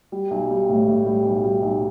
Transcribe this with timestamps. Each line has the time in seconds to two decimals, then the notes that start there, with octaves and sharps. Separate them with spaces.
0.12 G3
0.31 B1
0.50 G3
0.69 A2
0.88 A2
1.06 G3
1.25 B1
1.44 G3
1.63 B1